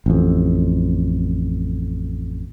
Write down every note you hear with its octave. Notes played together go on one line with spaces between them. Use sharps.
A1 F2